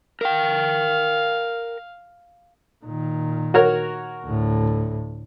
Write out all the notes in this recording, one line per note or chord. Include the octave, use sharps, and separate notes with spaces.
A#4 F5 G5
A#2 D#3
F#4 A#4 C#5
D2 A2